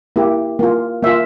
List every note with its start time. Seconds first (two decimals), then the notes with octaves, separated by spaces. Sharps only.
0.16 A#3 E4 G4
0.59 A#3 F4
1.03 A#3 F4 E5